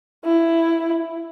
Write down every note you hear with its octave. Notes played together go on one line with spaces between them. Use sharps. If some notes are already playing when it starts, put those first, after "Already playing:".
E4